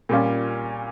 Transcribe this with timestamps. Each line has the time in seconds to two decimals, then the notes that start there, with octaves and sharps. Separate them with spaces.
0.09 A#2 G3 C#4 F4